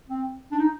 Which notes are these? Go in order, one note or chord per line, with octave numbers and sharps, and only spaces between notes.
C4
D4
D#4